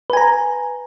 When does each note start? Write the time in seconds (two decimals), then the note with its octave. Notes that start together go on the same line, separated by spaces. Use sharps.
0.10 B4
0.13 G#5
0.17 A#5